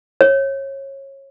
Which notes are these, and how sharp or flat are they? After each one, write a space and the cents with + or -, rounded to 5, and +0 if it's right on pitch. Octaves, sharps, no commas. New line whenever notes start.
C#5 -25